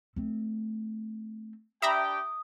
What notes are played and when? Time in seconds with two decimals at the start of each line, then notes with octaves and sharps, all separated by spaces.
0.16 A3 C4
1.82 D4 G4 E5 G5 A#5 B5 D#6